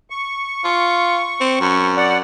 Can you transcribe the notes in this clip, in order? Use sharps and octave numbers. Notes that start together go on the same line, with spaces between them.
C#6
F4
C4
F#2
D5 F#5